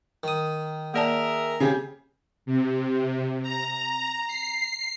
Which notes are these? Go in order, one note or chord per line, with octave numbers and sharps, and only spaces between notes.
D#3 D#6
A#3 G#4 A#4 D5 E5 A5
C#3 G4 G#4
C3
A#5
C7